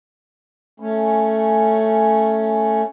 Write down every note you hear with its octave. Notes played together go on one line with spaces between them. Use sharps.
A3 C#4